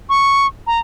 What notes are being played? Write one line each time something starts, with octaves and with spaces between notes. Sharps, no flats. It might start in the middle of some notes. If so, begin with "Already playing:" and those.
C#6
A#5